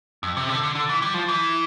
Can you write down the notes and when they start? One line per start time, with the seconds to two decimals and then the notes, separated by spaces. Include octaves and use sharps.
0.23 F2
0.37 C3
0.49 D3
0.63 D3
0.75 D3
0.89 E3
1.02 G3
1.14 F3
1.28 E3